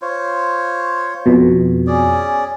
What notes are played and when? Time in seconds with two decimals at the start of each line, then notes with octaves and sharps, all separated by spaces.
0.02 F4 C5 C#5
1.26 F2 B2
1.87 C#4 G#4 D5